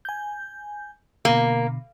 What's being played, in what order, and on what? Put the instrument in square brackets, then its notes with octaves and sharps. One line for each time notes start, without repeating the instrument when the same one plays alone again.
[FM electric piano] G#5 G6
[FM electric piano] B2 D3 [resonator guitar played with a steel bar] A#3